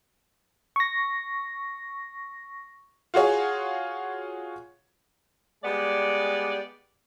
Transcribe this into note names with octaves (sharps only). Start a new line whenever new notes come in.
C#6 A#6
F4 F#4 G#4 C#5
G3 G#3 B3 D5